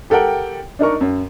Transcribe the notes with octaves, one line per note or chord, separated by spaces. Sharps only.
G4 A4 A#4 F#5 G5
D4 D#4 A#4 C#6
F#2